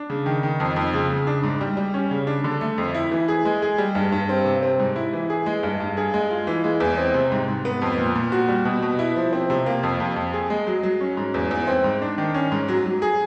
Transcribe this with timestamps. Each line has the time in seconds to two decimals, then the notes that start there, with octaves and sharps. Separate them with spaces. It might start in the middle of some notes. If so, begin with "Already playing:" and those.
Already playing: D4
0.10 C#3
0.26 D#3
0.43 D#3
0.60 F2
0.76 F2
0.93 C#3
1.10 C#3
1.27 D4
1.43 G#2
1.61 G3
1.77 G3
1.94 C#4
2.11 C#3
2.27 D4
2.44 D3
2.61 A3
2.78 F2
2.95 E4
3.12 E3
3.28 G#4
3.45 G#3
3.62 G#4
3.78 G3
3.95 G2
4.12 G2
4.29 C4
4.46 C3
4.63 C4
4.79 G#2
4.96 E4
5.13 E3
5.30 G#4
5.46 G#3
5.63 G2
5.80 G2
5.97 G#4
6.14 G#3
6.31 F4
6.47 E3
6.64 G#3
6.80 E2
6.97 C4
7.14 C3
7.32 G#2
7.48 G#2
7.65 B3
7.82 F2
7.98 A#2
8.15 A#2
8.32 F#4
8.49 G3
8.65 B2
8.82 B2
8.99 E4
9.16 F3
9.33 C4
9.50 C3
9.66 A#3
9.83 F2
10.00 F2
10.16 F2
10.33 G#4
10.50 G#3
10.67 F#3
10.83 F#3
11.01 C#4
11.17 G#2
11.34 E2
11.51 E2
11.67 C4
11.84 G#2
12.02 D4
12.18 D#3
12.35 C#4
12.52 G#2
12.68 F#3
12.85 F#3
13.02 G#4